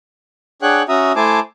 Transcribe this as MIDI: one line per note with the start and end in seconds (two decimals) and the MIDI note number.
0.62 0.83 62
0.62 0.83 68
0.62 0.83 73
0.62 0.83 78
0.62 0.83 79
0.62 0.83 90
0.89 1.12 61
0.89 1.12 66
0.89 1.12 76
0.89 1.12 82
0.89 1.12 87
1.16 1.40 57
1.16 1.40 64
1.16 1.40 72
1.16 1.40 80
1.16 1.40 81
1.16 1.40 86